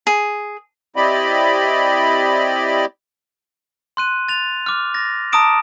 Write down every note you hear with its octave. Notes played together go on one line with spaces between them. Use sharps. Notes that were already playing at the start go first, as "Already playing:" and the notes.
G#4
C4 E4 G4 D5 D#5 B5
C6 F#6 D#7
A6 F7
D6 F6
A6 A#6
A5 A#5 D6 D#6 D7 E7